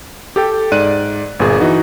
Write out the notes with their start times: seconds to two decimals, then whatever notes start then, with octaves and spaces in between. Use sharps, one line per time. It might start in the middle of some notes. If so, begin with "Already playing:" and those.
0.36 G4 A4 G5
0.72 G#2 D5 F#6 D#7
1.40 G1 A#2 G#4
1.60 E3 D#4 F#4